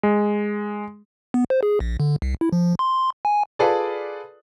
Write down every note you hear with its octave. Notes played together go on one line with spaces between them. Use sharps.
G#3
B3
C5
G#4
A#1
D3
C2
E4
F3
C6
G#5
F4 G#4 A4 B4 D5